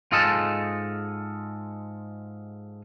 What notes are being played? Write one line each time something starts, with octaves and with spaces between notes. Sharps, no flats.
G#2 F4 G#4 A4 D#5 A5